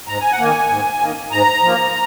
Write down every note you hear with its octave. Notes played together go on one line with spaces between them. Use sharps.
G#2 A#5
G#5
F#5
D#3 A#3 G#5
G#2
D#3 A#3
G#2 A#5
F3 A#3